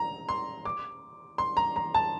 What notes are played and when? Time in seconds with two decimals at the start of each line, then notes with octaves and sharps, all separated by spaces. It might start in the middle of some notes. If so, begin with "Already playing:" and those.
Already playing: A#5
0.29 C6
0.65 D6
1.38 C6
1.57 A#5
1.76 A#5
1.94 A5